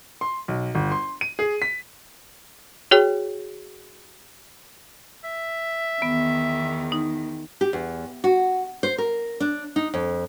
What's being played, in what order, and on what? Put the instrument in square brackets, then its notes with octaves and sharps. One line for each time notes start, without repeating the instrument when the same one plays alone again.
[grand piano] C6
B1
G1
C6
D#7
G#4
B6
[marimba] F#4 G#4 C#5 G5
[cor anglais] E5
[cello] E2 D#3 [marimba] B3
[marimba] D#4
[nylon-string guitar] G4
E2
F#4
C5
A#4
D4
D#4
F2